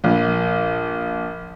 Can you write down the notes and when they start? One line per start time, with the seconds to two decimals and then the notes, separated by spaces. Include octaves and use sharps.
0.04 A#1